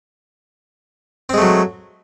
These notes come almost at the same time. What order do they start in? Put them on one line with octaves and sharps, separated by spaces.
C4 G#3 A3 F#3